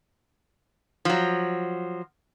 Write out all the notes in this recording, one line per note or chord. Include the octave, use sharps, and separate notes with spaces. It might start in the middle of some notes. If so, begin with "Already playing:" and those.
F3 F#3